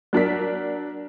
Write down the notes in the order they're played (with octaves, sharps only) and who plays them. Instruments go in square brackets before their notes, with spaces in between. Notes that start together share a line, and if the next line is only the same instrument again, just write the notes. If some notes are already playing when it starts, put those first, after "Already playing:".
[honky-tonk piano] F#3 D4 A#4 B6